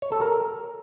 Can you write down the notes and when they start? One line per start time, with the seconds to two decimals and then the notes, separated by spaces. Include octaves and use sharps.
0.02 C#5
0.12 A4
0.21 A#4